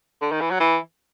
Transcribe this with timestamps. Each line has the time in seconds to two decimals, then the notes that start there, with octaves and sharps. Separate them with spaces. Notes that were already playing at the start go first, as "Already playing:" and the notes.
0.22 D3
0.32 D#3
0.41 E3
0.51 F#3
0.60 E3